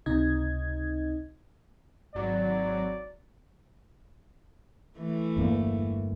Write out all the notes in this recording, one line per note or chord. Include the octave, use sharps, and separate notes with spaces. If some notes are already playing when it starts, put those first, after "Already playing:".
C#2 C3 D#4 D#5 G#6
G#1 F#3 D5
E3 A3
G1 E2 A#3